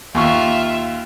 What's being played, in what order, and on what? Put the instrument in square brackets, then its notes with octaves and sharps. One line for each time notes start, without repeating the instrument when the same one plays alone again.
[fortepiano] D#2 C#6 [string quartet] F4 E5